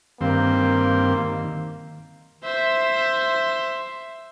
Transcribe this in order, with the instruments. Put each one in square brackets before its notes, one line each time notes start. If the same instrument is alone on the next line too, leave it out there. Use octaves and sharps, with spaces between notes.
[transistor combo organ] G2 C4 [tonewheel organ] D#3 [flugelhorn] A#3
[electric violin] C5 E5